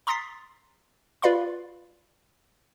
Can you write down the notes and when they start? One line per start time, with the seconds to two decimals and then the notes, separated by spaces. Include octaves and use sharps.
0.07 A#5 C6 D#6 A6 B6 C7
1.22 F4 B4 D5 F5 B5 C6